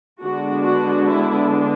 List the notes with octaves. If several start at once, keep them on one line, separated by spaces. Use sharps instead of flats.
D3 G#3 B3 D4 F#4
F#4
E4